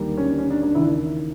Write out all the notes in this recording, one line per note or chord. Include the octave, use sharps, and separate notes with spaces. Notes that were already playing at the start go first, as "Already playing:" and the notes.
Already playing: D#2 D3 G3 A#3
C#4
D4
C#4
D4
D4
D#2 C#3 E3 D4 E4